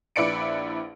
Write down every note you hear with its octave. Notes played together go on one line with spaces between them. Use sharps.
A#1 E4 B4 D5 C#7 D7